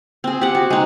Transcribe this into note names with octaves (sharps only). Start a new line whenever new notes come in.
C4 G#4
G4 F#5
F#4
G#3 D#4